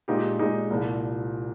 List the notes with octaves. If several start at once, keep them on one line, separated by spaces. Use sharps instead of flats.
A#2 G#3 D#4 G4
A#2 G#3 D#4 G4
C2 A#2 F3